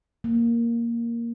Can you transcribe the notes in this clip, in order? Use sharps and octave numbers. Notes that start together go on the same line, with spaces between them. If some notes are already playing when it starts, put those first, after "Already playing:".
A#3